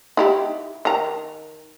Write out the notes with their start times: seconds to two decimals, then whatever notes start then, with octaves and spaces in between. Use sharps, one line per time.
0.17 D#4 E4 G4
0.85 D#3 A#5